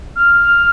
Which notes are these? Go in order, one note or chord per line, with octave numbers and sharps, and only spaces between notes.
F6